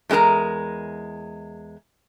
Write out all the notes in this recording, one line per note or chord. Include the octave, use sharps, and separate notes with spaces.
E2 G#3 D4 A#4 A#5